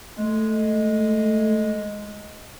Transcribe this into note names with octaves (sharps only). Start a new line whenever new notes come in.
G#3 A3